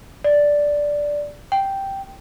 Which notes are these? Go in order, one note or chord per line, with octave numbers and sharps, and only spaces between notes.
D5
G5